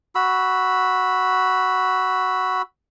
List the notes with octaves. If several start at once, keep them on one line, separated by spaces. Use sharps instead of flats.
F#4 B5 E6